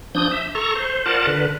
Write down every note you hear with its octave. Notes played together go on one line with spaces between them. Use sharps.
F3 D4 D#6 G6
E5
A4 A#5 C#6
C5
F4 A#4 D5 F#5 A5
D3 B4